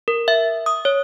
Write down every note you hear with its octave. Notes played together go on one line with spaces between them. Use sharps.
A#4
E5
D#6
C#5